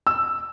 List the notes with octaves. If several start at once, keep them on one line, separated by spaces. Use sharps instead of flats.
E6